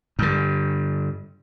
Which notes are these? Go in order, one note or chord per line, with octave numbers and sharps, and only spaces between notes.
G2 D3